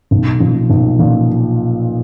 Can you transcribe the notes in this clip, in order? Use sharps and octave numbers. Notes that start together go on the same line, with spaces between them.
B1
A#2 F3
B1
A#2 F3